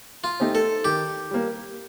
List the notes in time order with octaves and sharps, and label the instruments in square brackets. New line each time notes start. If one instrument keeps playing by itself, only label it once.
[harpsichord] F4
[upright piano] A3 D#4 G4 C5
[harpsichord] A4
[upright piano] D#3 [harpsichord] G4
[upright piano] G3 A#3